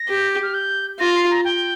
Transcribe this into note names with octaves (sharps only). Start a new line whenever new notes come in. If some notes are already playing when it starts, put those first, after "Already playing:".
Already playing: A#6
G4
F6
G6
F4 A#6
C6
A#5
G5